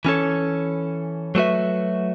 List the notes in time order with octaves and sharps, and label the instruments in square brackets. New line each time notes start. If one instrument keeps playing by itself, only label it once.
[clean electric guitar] E3 C#4 A4 C#5
F#3 A3 F#4 B4 E5